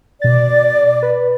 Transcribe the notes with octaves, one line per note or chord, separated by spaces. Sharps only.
B2 D5 A6
B4